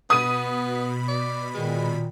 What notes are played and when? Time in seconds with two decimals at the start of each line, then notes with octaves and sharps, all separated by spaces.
0.10 B2 B3 B5 D#6 D#7
1.08 D5
1.54 A#2 D#3 G#3